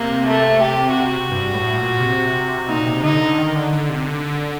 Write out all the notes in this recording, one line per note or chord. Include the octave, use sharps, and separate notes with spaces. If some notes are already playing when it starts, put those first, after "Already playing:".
Already playing: C3 A#3
A3
G4
F#4
G2
A2
A#2
C3
A#2 D#4
C3
D3 D#4
D3
D#3
D3
D3
C3
D3